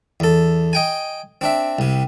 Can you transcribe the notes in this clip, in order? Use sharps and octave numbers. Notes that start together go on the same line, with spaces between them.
E2 A4
D#5 G5 G#5
C4 D4 E5
C2 C3